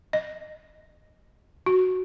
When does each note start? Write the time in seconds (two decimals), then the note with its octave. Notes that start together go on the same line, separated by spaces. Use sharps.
0.13 D#5
1.66 F#4